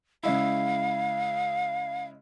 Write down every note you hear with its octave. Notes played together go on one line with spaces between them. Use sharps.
C#3 G#3 E4 F5